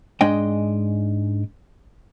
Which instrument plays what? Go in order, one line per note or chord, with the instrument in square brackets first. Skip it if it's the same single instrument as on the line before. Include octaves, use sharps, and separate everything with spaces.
[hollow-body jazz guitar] G#2 G#3 D4 D#5 G5